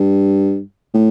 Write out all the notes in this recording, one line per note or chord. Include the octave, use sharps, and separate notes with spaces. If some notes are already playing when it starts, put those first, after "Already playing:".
Already playing: G2
A2